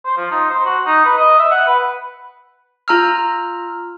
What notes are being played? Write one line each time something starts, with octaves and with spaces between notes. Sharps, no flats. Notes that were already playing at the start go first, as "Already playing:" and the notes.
C5
F3
D#4
C5
F#4
D#4
B4
D#5
E5
F#5
B4
F4 A#5 E6 F6